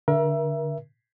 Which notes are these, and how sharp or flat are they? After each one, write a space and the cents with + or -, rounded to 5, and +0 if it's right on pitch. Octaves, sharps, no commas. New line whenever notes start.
D3 +0 A#4 +35 E5 +15